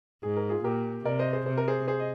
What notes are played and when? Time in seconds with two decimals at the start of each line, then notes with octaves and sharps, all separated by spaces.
0.23 G#2 G#4
0.37 A#4
0.50 F4 G#4
0.64 A#2 G4 A#4
1.05 C3 A#4 D5
1.19 C5 D#5
1.33 G#4 C5
1.46 C3 C5
1.58 A#4
1.68 G#4 C5
1.88 G#4 C5
2.00 D#5